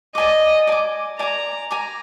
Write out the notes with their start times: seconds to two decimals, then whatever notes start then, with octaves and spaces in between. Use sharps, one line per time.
0.15 D5 D#5 G#5 D6
0.67 D5 G#5 D6
1.19 D5 G#5 A#5 D6
1.71 D5 G#5 A#5 D6